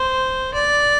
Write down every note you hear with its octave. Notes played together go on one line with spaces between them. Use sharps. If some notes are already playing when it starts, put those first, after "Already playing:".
Already playing: C5
D5